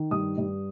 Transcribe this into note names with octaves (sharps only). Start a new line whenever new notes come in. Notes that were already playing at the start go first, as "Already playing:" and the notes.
Already playing: D#3
G2 D#6
G2